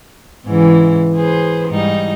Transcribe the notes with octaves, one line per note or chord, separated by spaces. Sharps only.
G#2 C#3 E3
G#4 B4 C5
G#2 G3 D#4